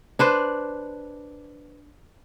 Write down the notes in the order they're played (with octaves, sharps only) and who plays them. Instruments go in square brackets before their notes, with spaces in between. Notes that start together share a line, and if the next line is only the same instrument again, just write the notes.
[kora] D4 B4 C5